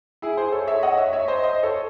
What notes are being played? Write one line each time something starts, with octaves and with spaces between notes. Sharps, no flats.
E4 G#4
G#4 C5
A4 C#5
C#5 E5
D#5 F#5
C#5 E5
C#5 E5
C5 D#5
C5 D#5
A4 C#5